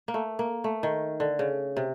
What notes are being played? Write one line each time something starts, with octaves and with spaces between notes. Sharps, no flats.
A#3
A3
A#3
A3
D#3
D3
C#3
C3